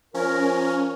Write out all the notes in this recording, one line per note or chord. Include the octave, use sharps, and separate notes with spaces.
F3 C#4 A#4